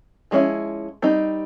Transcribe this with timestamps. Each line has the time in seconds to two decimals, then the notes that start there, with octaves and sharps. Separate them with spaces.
0.31 F3 G#3 C#4 E4
1.02 G3 C4 D#4